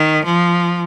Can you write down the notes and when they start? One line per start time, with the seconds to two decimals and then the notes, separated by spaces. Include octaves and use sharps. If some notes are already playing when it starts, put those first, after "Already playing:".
Already playing: D#3
0.25 F3